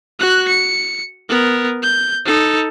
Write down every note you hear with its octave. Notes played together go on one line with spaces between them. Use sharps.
F#4 F#6
C#7
B3 A#4
G6
D#4 A4